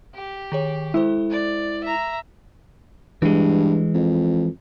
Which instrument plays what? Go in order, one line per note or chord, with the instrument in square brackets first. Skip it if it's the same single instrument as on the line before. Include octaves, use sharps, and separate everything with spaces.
[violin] G4
[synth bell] D#3 G#4 C#5
[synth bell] G#3 A4 C5 [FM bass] E4
[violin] D5
E5 A#5
[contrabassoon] G2 [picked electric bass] E3 G#3
[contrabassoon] F2